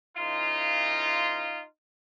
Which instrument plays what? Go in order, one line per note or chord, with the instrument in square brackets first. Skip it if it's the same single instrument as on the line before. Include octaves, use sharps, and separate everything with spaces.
[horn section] C#3 E3 D#4 F4